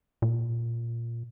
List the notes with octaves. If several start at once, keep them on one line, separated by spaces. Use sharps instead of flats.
A#2